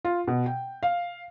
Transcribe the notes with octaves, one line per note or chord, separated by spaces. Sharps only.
F4
B2
G5
F5